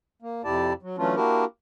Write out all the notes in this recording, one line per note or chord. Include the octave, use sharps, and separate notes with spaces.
A#3
F2 C3 E4 G4 D5 A5
F#3
E3 F#3 A3 C#4 D4 F4
A#3 D4 E4 F#4 G4 A#4